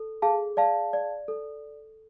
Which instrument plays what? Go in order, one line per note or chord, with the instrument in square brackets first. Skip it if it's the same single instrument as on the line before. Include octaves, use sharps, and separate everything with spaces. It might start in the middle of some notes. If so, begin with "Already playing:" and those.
Already playing: [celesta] A4
G#4 F5 A5
D5 F5 A5
D5
A4